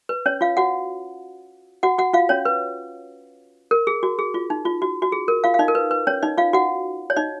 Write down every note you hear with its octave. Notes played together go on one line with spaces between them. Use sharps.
B4
C#4 C#5
F4 F5
F#4 F#5
F#4 F#5
F#4 F#5
F4 F5
C#4 C#5
B4
A#4
G#4
F#4
G#4
F4
D#4
F4
F#4
F#4
G#4
A#4
F4 F5
F5
D#4 D#5
A#4
B4
B4
C#4 C#5
D#4 D#5
F4 F5
F#4 F#5
C#5
D#4 D#5